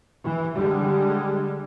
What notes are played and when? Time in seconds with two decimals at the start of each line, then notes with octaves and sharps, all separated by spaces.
0.23 E3
0.56 D3 G3 G#3